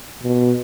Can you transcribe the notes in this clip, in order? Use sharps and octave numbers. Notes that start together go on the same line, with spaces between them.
B2